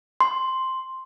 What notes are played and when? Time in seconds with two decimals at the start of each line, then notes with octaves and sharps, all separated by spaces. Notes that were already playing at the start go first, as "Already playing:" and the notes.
0.21 C6